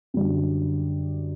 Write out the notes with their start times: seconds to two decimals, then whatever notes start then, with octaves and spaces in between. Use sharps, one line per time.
0.14 F#2 D3 G3